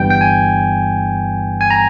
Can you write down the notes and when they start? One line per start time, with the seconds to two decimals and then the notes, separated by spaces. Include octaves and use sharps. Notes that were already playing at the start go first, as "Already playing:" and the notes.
Already playing: G1 G2 E3 G3 B3 G5
0.10 G5
0.21 G#5
1.61 G#5
1.70 A#5